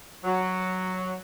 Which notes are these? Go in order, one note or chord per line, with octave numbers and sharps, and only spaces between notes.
F#3